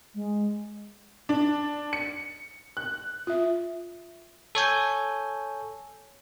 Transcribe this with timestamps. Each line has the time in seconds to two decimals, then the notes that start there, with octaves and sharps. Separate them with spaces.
0.15 G#3
1.29 D4
1.93 C#7
2.77 F#6
3.27 F4 E5
4.55 A4 C#5 G#5 G6